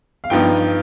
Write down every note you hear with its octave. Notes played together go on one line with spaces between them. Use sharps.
F5
G2 F3 B3 D#4 G5